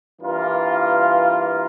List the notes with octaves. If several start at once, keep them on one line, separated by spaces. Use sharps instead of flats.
G2 E3 A#3 F4 A#4